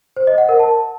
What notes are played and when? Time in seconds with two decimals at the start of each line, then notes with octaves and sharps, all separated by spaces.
0.17 C5
0.27 D#5
0.38 F#5
0.49 A#4
0.59 A5